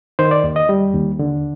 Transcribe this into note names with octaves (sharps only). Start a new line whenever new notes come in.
D#3 C5
D5
D#2
D#5
G3
D#2
D3